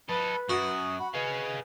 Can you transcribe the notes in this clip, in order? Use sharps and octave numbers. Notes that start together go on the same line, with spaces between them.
A4 B4 D#5 B5
F#2 F#4 D#6
F#5 B5
G#4 B4 D#5 F5